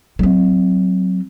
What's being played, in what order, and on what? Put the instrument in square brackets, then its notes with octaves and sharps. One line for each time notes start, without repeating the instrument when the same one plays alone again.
[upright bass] F#3 C4